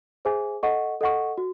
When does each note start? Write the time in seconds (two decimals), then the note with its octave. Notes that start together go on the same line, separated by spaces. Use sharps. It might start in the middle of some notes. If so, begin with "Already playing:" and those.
0.25 G#4 C5 E5 G#5
0.63 A4 D#5 F#5 C#6
1.01 A4 D#5 F#5 C#6
1.38 F#4